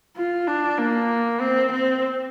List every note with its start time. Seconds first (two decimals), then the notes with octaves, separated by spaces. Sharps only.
0.16 F4
0.47 D4
0.78 A#3
1.41 C4
1.72 C4